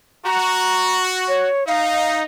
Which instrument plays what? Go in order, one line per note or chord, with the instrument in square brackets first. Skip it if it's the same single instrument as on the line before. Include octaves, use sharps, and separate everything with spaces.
[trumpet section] F#4 [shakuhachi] A#5
[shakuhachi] C#5
[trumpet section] D#4 [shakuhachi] F5